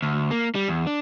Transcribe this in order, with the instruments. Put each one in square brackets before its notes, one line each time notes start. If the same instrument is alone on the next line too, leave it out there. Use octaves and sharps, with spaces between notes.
[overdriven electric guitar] D2
A#3
G3
E2
D4